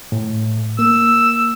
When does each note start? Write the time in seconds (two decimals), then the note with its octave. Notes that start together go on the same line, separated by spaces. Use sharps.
0.12 A2
0.79 A#3 E6